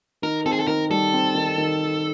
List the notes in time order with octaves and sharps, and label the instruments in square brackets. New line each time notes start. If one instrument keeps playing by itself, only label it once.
[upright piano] D#3 [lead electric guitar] A#4
[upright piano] C4 [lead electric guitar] A4
[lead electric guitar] G#4
A4
[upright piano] D#3 [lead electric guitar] A#4
[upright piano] G3 [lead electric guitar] A4
[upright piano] C4
D#3
D#3